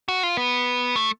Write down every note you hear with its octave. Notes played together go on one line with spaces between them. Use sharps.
F#4
F4
B3
A3